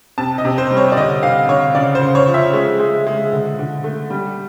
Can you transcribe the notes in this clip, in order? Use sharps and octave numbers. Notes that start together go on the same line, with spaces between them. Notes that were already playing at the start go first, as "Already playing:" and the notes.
C3 A5
D#5
C3
C5
G3
C#5
D5
D3 D#5
D3 F5
D3 C#5
C#3 D5
C5
C#3
C#5
F3
E5
G#3
G#3
G#3
D3
D3
A3
G3